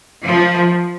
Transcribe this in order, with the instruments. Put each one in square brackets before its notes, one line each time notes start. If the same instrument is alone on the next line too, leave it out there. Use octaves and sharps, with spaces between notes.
[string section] F3